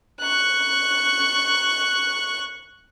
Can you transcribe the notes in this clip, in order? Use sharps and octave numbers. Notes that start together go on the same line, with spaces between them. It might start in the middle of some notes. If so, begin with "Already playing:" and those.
C#6 F#6